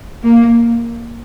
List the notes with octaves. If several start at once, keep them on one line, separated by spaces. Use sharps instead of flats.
A#3